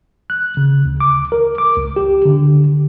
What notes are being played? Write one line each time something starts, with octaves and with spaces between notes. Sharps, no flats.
F#6
C#3
D2
D6
A#4
D6
C#2
G4
D3